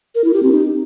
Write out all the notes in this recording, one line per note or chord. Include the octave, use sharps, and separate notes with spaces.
A#4
E4
G4
C4
D#4